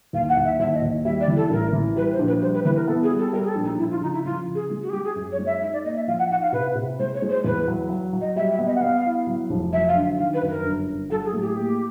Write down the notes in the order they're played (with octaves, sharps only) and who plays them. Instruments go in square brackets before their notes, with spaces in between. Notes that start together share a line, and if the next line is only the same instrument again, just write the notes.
[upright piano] D#2 [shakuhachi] F5
[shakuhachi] F#5
[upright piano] D#2
[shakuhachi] E5
[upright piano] D#2 [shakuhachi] E5
[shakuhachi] D#5
[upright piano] D#2
[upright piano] G3 [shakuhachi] E5
[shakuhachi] D5
[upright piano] E3
[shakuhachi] A4
[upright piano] A1 [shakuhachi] A#4
[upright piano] E3
[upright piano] G3 [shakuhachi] B4
[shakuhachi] C5
[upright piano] A#1
[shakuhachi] B4
[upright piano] G3 [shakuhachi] C5
[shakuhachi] B4
[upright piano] E3 [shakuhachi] B4
[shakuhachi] A#4
[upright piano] B3 [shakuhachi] A4
[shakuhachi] G#4
[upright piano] G3
[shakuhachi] A4
[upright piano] G3 [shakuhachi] A#4
[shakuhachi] G#4
A4
[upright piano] A#1
[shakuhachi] D#4
[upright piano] F3 [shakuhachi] E4
[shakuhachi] F4
[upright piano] C#3 [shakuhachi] D#4
[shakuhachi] E4
[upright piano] F3 [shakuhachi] F4
[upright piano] C#3
[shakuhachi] G#4
[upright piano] G#3
[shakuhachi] F#4
G#4
[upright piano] G#3 [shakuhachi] G4
[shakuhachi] G#4
[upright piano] F#2
[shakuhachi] C#5
[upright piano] G#3
[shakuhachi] E5
[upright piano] D#4 [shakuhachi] E5
[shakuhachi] D5
[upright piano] A#3 [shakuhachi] D#5
[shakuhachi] E5
[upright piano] F3 [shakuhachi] F5
[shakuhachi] F#5
[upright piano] D#4 [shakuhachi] F#5
[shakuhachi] F5
[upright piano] C3 [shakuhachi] B4
[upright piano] C3
[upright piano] G#3 [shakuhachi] C5
[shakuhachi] C#5
[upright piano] G#3
[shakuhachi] C5
[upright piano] E2 [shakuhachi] B4
[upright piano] F#3
F#3
F#3
[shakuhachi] D#5
[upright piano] G3 [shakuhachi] E5
[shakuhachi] E5
[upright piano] B3
[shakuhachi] D#5
F#5
[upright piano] B3 [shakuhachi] F5
[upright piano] E4
F#3
F1
[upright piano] F#3 [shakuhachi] E5
[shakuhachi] F5
[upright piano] D3
[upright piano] D#3 [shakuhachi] F5
[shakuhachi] B4
[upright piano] F#2
[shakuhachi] A#4
[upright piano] G1
G1
[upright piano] F#3 [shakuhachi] A4
[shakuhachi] G#4
[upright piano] A2
[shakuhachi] G4
G#4
[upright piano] A#3 [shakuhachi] G4